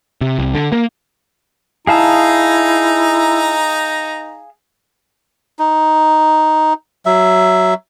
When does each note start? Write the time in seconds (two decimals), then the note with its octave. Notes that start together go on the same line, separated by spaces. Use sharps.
0.21 C3
0.39 C2
0.55 D3
0.72 A#3
1.87 D#4 E4 G#4 F5 A5 A#5
5.59 D#4
7.06 F#3 E5